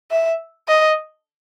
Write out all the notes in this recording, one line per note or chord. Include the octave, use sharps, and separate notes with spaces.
E5
D#5